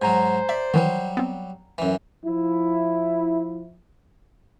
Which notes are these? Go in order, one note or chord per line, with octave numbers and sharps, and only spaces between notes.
G#2 F#3 C5 G#5 A#5
D5 E5
D#3 E3 F#3 G3
B3 C4
F#2 E3
F3 E4